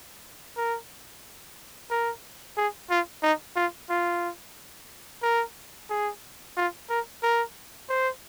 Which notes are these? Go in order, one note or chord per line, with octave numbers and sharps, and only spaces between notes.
A#4
A#4
G#4
F4
D#4
F4
F4
A#4
G#4
F4
A#4
A#4
C5